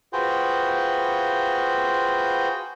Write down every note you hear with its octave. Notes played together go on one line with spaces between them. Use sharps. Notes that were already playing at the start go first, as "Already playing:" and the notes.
F4 F#4 G#4 B4 C5 G5